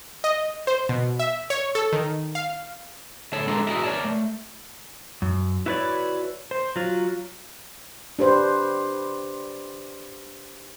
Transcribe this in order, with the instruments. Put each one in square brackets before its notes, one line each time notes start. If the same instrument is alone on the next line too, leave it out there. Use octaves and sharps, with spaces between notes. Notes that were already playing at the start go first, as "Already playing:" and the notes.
[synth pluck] D#5
C5
B2
E5
C#5
A4
D#3
F5
[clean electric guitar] D2 A4 C#5 A5
G#3 D4 F4 G4 A4 A#4
E4 F#4 G#4 A#4 D#5 E5
A#4 B4 C#5 D5 A5
A3
[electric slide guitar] F#2
E4 F#4 B4 C#5 D5
C5
F#3 F4
[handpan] D4 G4 B4 C5